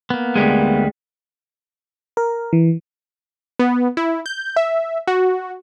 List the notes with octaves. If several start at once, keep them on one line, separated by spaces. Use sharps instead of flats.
A#3 B3
D2 G3 G#3
A#4
E3
B3
E4
G6
E5
F#4